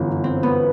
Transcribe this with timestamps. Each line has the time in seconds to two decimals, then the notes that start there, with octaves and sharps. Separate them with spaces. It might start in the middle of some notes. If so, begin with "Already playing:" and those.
Already playing: G1 F#2 E3
0.24 C4
0.43 B3